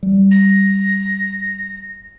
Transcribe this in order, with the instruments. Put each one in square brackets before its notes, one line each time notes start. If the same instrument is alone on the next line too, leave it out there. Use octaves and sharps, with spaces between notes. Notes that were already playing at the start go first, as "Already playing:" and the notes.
[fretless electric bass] G3
[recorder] A#6